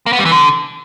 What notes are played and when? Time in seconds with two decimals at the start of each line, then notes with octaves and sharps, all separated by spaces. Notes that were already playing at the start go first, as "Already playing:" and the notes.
0.06 A#3
0.13 B3
0.19 G3
0.25 E3
0.31 D3